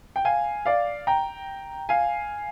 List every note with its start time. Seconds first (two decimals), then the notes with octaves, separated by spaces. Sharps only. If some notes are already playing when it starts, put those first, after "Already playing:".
0.16 G5
0.25 F5 G#5
0.65 D5 F5
1.07 G5 A#5
1.89 F5 G#5